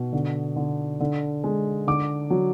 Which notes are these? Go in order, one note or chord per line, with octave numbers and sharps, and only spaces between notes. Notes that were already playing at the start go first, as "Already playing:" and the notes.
Already playing: B2
D3
D3
D3
G#3
D3 D6
F#3